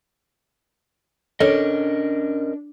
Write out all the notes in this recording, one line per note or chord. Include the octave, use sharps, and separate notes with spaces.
C#4 D4 A4 A#4 C#5 D#5